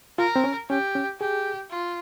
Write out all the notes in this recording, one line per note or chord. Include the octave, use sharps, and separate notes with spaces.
F4 A#4
C4
C#4
C#4 G4
C#4
G4 G#4
F4